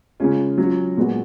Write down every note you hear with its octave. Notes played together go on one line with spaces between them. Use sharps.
C#3 G#3 C#4 F4
F#3 C#4 F4
A#2 G#3 B3 F#4